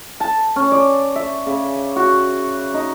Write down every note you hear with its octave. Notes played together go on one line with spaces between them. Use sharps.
A5
C#4
D5
E5
C#3
F#4
D#4